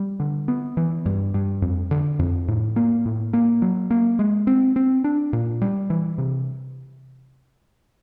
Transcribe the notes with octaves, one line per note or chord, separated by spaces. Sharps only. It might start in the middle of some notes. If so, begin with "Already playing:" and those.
Already playing: G3
D3
B3
E3
G2
G2
F2
D3
F2
A2
A#3
A2
A#3
F#3
A#3
G#3
C4
C4
D4
A#2
G3
E3
C3